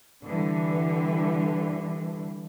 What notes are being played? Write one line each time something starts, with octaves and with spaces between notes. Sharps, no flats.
D3 E3 G3